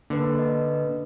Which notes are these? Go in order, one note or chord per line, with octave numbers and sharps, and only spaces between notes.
D3 A#3 B4
B4 D#5